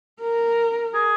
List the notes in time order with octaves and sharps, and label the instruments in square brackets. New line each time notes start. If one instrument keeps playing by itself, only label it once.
[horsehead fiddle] A#4
[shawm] G#4